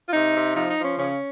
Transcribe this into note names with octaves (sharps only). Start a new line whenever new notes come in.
F4
C3 D#4
C3
F3 D#4
D#4
F3
C#4
C#3 C#4